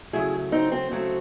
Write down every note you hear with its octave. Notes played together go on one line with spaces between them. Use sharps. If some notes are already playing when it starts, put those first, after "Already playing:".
C#3 F#3 A3 E4 G#4
C4 D#4
C4
C#3 F#3 A3 C4